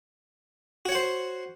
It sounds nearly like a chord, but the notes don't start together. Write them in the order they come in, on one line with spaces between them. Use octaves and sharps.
F#4 C#5 F#5 C5